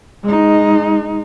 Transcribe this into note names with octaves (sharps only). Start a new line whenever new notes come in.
G#3 D#4